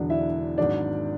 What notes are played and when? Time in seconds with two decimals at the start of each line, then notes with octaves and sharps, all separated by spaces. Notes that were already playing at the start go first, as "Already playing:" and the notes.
Already playing: E1 E2 D3 F#3 D4
0.10 E4 E5
0.58 G#1 G#2 F#3 D4 D5